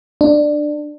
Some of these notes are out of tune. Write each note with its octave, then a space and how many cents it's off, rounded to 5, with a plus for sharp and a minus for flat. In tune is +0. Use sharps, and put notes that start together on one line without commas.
D4 +15